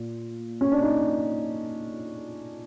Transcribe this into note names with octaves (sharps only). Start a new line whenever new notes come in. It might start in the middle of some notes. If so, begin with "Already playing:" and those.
Already playing: A#2
C#4
D4
D#4